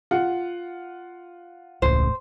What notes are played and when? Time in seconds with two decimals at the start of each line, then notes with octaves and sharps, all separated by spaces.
0.11 F4 F#5
1.82 E1 C#2 A2 C5